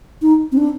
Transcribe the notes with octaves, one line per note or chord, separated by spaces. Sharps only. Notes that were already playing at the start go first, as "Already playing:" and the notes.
D#4
C4
D4